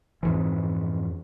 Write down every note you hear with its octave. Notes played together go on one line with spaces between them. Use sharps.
F2 G#2 E3